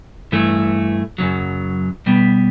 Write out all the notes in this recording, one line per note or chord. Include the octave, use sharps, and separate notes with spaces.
G2 E3 A3
F#2 C#3 F#3
B2 G3 B3